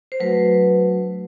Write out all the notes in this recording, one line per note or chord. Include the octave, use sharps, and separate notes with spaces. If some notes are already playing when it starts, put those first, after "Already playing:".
C5
F#3 A3 D4 F#4 B4